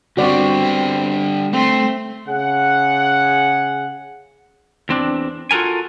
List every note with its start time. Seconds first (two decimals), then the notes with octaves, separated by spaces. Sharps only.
0.17 D3 G3 C4 F#4 D5
1.53 A3 C4 C6
2.28 C#3 G#4 F#5
4.89 E2 C4 D4
5.51 F4 F#4 A4 A#4 G#5